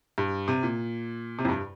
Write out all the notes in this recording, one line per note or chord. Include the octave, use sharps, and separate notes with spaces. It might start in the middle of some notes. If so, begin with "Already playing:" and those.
G2
C3
A#2
C3
F2
G2